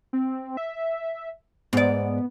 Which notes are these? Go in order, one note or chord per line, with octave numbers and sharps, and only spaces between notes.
C4
E5
G#2 B3 D5